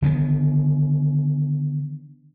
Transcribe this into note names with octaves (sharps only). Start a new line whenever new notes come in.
D3 D#3 G3 B3